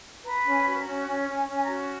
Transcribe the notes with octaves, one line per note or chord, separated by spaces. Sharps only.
B4 A#5
C#4
G#5
F#4
A#5
C#4
C#4 G#5
C#4
G#5
C#4
G#5
A#5
F#4